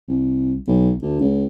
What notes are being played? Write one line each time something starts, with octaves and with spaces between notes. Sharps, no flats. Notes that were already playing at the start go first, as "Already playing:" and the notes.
C2
B1
D2
C#2